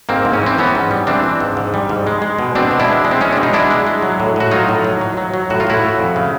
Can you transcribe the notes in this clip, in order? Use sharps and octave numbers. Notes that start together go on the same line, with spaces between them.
G#2 A#3 C4
G#2
C#4
E3 C4
E3 B3 C#4
G#2
G3
E3 C4 D4
E3
G#2
G#2
G3
G#2
G#3
G#3
B2
B2 C4 D4
B2
D4 E4
G#3
G#3
C4
G#3 C#4
B2 D4
D#4
G#3 D4 E4
G#3
G#3
F#3
A2
A2 F#4
F#3 D#4 F4
A2
F#3
F#3
F#3
F#3
A2 F#4
F4
A2 E4 F#4
A2
F2
C#3